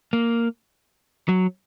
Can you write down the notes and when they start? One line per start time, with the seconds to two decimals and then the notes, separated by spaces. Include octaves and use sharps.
0.13 A#3
1.29 F#3